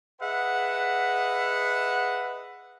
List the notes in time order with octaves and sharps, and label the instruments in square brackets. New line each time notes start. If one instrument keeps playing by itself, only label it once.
[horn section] G#4 B4 D#5 E5 F#5